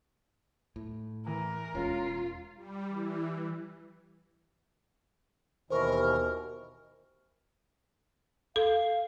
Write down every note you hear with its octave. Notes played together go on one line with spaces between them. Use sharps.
A2
E3 A#4
E1 G#3 C#4 F4
G3
E3
D#2 B2 E3 A#4 C5 C#6
A4 F5